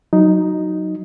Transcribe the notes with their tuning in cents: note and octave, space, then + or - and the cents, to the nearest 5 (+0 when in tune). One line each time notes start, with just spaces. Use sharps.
F#3 +0 D#4 +0